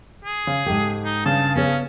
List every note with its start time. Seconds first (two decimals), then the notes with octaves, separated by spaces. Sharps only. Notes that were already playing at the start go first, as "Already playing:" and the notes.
0.24 G#4
0.47 C#3 C#5
0.66 G#2 G4 A4
1.05 D#4
1.26 G2 C#3 A5
1.55 B3 C#4 G#4 C#5